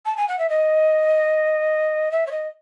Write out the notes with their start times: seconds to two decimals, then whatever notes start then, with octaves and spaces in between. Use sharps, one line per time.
0.06 A5
0.17 G#5
0.28 F#5
0.39 E5
0.50 D#5
2.12 E5
2.27 C#5
2.31 D#5